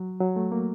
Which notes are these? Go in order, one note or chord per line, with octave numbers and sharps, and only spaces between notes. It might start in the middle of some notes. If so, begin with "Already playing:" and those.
Already playing: F#3
F#3
A3
A#3